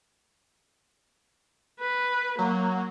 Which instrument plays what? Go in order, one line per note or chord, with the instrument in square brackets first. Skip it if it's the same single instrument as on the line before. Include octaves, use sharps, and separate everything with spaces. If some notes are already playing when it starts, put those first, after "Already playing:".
[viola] B4
[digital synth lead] F#3 [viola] A#3